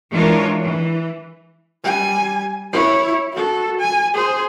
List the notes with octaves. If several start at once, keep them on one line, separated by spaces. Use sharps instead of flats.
E3 G#3 D4 F4 A#4 C#5
E3
G3 G#5
E4 C#5
F#4 A4
G#5
G#4 C5